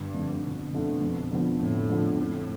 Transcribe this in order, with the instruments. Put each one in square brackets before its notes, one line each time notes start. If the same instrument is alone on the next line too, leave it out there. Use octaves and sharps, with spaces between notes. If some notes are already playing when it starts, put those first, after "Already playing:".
Already playing: [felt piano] G1 [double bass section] G2
[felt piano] F2 D3 A3
[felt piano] G1 [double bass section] B2
[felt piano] F2 D3 A3
F2
D3 F3 B3 F4
[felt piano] F2 [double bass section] A2
[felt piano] D3 F3 B3 F4
[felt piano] F2 [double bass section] A2